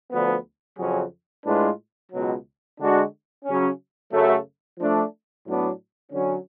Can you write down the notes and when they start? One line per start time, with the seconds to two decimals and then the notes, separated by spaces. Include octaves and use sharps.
0.12 D2 D3 F3 B3
0.78 F2 C#3 F#3 C#4 G#4
1.45 A2 G#3 D4 F4 B4
2.12 C#2 B2 F#3
2.79 D3 G#3 D4 F#4
3.45 C#3 F#3 C#4
4.12 F#2 C#3 F#3 A3
4.79 F3 A3 D4
5.46 A2 F#3 B3 D4
6.12 D3 F#3 C#4